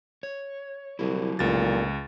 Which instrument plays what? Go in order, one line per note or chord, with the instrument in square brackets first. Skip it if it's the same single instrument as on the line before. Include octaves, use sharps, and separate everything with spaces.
[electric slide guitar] C#5
[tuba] C2 [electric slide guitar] F#3 E4
[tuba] F1 [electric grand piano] C#2 A6 [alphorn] A#2